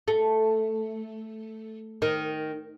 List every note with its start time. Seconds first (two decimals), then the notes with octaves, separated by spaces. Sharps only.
0.08 A3
2.02 D#3